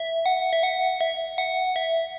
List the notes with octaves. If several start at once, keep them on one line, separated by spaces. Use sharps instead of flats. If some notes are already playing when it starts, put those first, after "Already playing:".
Already playing: E5
F#5
E5
F#5
E5
F#5
E5